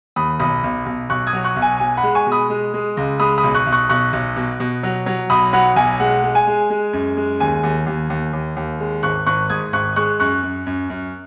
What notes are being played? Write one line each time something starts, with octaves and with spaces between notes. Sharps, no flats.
D#2 B5 D#6
B1 B5 D#6
B1
B1
B1 C#6 F#6
D#6 G#6
F#3
C#6 F#6
B1
G#5
B2 G#5
F#5 B5
G#3
G#5 C#6
B2
B5 D#6
G#3
G#3
C#2
G#3 B5 D#6
B5 D#6
B1
C#6 F#6
B1
C#6 F#6
B1 C#6 F#6
B1
B2
B2
F#3
F#3
B1 B5 D#6
F#3 F#5 B5
B1 G#5
G#3 F#5
G#3
G#5
G#3
G#3
F#2
G#3
D#2 G#5
D#2
D#2
D#2
D#2
D#2
G#3
G#1 C#6 F#6
G#1 C#6 F#6
G#2 D#6 G#6
G#1 C#6 F#6
G#3 C#6 F#6
F#2 C#6 F#6
F#2
F#2
F#2